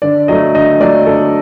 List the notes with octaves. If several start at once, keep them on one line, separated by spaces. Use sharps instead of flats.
D3 D5
F#3 A3 D#5
D3 D#5
F#3 A3 D5
D3 A4